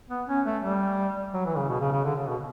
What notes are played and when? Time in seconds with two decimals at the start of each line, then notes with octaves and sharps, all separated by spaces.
0.10 B3
0.28 C#4
0.46 A3
0.64 G3
1.34 F#3
1.46 E3
1.57 C#3
1.69 B2
1.81 C#3
1.92 C#3
2.04 D3
2.16 C#3
2.28 B2